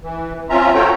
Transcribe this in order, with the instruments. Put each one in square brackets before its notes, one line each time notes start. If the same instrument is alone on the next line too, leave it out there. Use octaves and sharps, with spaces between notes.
[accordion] E3
C4 C#4 F4 E5 A#5
F4 F#4 A4 C#5 G5 A#5